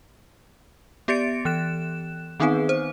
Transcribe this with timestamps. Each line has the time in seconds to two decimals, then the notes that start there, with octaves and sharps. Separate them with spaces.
1.08 B3 G4 D5 A6 C#7 D7
1.45 E3 F#6 E7
2.40 D#3 B3 C4 D#4 G#4 B4
2.69 C5